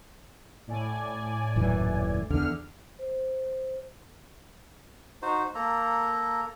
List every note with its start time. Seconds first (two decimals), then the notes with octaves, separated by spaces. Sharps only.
0.67 A2 D5 G#5
1.56 D#1 F#2 E3
2.30 E2 D3 F6
2.99 C5
5.22 D#4 F#4 C5
5.55 A#3 A4 A#5